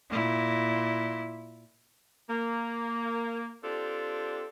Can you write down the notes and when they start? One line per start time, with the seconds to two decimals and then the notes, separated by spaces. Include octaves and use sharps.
0.10 A#2 E4
2.29 A#3
3.63 C4 D4 F4 G4 A4